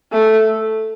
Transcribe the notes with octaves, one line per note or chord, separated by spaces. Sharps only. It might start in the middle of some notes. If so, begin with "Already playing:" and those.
A3